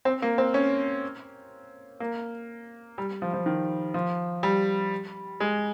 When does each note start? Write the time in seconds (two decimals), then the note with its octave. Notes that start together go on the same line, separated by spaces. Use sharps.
0.05 C4
0.22 A#3
0.38 C4
0.54 C#4
2.00 A#3
2.98 G3
3.22 F3
3.34 F3
3.46 D#3
3.94 F3
4.43 G3
5.40 G#3